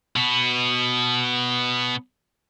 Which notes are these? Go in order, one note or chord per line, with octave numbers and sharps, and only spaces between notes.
B2 B3